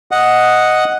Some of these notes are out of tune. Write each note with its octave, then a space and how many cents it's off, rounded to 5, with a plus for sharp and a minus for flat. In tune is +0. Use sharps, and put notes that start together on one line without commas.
D#5 +0 F#5 +0